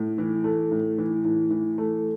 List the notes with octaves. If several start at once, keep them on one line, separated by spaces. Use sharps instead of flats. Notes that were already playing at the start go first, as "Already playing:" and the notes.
Already playing: A2
E3
A3
A2
E3
A2
E3
A3